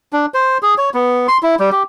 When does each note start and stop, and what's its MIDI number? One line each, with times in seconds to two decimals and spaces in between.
0.13 0.26 62
0.34 0.58 72
0.63 0.74 68
0.78 0.90 73
0.94 1.27 59
1.28 1.38 84
1.43 1.55 64
1.60 1.70 55
1.72 1.83 67